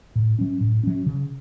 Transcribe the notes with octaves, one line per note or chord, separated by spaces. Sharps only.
A2
F#3 C#4
A2
F#3 C#4
C#3